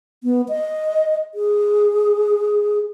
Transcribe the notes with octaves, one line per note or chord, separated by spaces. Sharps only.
B3
D#5
G#4